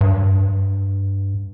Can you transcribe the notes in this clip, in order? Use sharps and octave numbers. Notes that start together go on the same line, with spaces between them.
G2